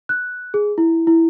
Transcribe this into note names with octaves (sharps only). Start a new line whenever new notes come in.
F#6
G#4
E4
E4